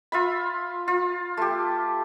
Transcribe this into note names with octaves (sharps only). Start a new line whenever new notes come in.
F4 E5 B5
F4
A3 G4